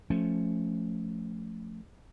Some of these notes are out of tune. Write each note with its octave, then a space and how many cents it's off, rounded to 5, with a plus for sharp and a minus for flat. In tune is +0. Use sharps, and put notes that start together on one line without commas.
F3 +0 A3 +0 C#4 +0